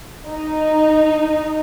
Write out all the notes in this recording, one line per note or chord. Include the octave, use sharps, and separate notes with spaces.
D#4